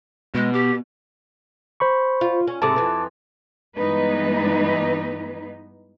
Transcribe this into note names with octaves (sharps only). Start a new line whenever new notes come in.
B2 G#3
G4
C5 B5 C#6
F4
C#4
G#2 C3 A3 A5 D6
F2 E3
G2 E3 G#3 B3 D#4 B4